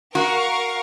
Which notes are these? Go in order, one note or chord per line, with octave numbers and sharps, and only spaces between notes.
F#4 A#4 F5 C#6